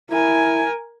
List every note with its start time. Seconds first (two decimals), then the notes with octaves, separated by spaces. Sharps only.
0.11 E4 A#4 G#5